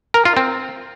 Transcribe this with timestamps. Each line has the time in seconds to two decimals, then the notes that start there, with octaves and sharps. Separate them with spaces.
0.14 A#4
0.25 F4
0.37 C4